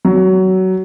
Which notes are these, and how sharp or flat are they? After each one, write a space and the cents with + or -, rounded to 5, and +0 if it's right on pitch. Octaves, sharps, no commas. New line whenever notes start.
F#3 +20